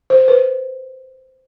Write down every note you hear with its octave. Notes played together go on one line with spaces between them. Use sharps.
C5
B4